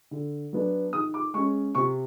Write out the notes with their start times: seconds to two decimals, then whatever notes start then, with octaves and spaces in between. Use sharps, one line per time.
0.11 D3
0.53 F#3 B3 D4
0.93 D#3 D#6
1.14 D6
1.34 G#3 C#4 C#6
1.75 C3 C#6